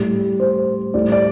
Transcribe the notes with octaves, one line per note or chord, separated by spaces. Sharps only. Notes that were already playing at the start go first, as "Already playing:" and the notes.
Already playing: A2 G3
C5
A2 G3 D5
D5